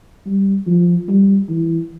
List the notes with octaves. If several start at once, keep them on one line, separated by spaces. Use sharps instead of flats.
G3
F3
G3
E3